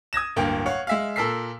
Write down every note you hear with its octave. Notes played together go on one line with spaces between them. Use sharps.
D#6 G#6 A#6 E7
D1 G2 A#3 G5
C#5 F5 F#5
G#3 E5 F5
A#2 A4 A#4 E6 B6 C7